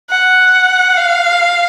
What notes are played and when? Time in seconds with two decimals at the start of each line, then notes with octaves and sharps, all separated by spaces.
0.10 F#5
0.97 F5